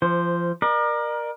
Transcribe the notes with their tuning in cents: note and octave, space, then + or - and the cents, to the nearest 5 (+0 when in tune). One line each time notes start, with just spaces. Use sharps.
F3 -25 C5 +0
A#4 +20 D5 +40